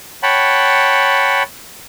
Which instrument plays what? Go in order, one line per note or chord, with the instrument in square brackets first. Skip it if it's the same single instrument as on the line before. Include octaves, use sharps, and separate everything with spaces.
[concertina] C#5 F#5 G5 A5 B5